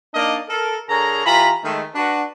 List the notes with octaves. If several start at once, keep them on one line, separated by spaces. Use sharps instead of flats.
A#3 D4 D#4 A#4 D5 D#5
A4 A#4
D3 G#4 A#4 C#5 A#5
E3 F4 G4 A#5 B5
D#3 G#3 A3
D4 F#4 B4